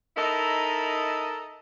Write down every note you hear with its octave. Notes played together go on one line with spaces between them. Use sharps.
D#4 E4 A4 A#4 D#5